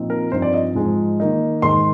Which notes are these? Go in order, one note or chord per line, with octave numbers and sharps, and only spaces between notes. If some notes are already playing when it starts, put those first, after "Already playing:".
Already playing: A#2 F3 C4 D#4
A#4
G2 F3 C4 D#4 C5
D5
D#5
G#2 F3 G#3 D#4
D#3 A#3 D#4
G#2 D#3 G#3 D#4 C6